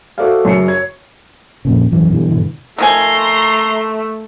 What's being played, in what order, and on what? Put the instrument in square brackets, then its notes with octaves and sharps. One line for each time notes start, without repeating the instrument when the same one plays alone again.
[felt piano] F#4 A4 C5 D5 E5 F5
F#2 C#3 C7 C#7
C#5 G#6
[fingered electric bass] F2 A#2 C#3
E1 A1 F#2 E3
B2 D3 E3 G3
G2 B2 D3 E3
[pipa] D#3 F3 G#5 [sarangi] A3 [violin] A#5 C6